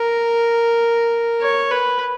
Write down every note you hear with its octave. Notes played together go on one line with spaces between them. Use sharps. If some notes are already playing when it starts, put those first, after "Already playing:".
Already playing: A#4
C#5
B4